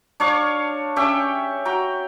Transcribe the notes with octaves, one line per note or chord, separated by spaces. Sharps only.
D4 C#5 F5 C#6
C#4 G4 E5 G5
F#4 G5 A#5